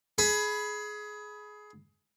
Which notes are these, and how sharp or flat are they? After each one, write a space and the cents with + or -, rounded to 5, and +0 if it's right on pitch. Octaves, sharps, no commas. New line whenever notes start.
G#4 +20 B5 +0